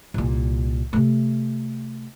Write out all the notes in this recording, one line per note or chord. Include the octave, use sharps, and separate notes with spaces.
C2 A#2
C3 A3